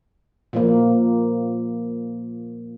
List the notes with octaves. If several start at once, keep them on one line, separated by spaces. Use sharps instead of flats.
A#2 F3 A#3